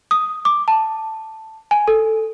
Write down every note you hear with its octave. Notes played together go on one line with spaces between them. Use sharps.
D#6
D6
A5
G#5
A4